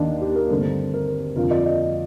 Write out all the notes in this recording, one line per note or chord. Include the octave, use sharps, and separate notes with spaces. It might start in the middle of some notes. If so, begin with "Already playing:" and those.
Already playing: D#2 D#3 A#3 D4 D#4
G4
A#4
G2 D3 A3 C4
A#4
F2 D3 F3 A#4
D5
D#5